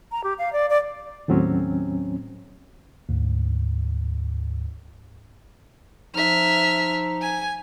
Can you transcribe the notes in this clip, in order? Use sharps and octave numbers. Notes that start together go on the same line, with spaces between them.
A#5
G4
F5
D5
D5
D#2 A2 F#3 C4 C#4
D2 G#2
F3 D#4 E5 F6
G#5